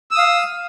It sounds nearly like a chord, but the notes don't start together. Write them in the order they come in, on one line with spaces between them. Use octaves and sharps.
E6 D#6 F5